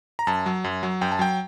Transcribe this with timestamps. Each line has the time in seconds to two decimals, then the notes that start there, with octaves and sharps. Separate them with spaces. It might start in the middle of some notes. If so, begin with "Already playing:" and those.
0.19 A#5
0.27 F#2 A5
0.46 F#3
0.64 F#2
0.83 F#3
1.01 F#2 G5
1.12 A5
1.19 F#3 G5